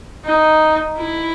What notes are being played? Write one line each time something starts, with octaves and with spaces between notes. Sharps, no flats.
D#4
E4